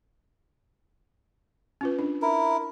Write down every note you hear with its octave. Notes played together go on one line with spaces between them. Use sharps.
C#4 F4 B4
D4
E4 A#4